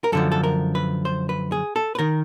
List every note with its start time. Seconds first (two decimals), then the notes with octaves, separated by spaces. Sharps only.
0.04 A#4
0.12 F#2 D3 F3 A4
0.32 A4
0.44 A#4
0.75 B4
1.05 C5
1.29 B4
1.52 G#4
1.76 A4
1.95 B4
1.99 D#3 A#4